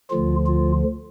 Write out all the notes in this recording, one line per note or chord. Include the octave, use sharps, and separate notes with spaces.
D2 D3 F3 F4
F4